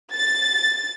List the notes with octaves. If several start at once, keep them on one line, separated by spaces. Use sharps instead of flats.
A6